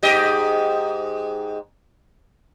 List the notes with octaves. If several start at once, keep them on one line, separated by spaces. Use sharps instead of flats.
G#2 G4 D#5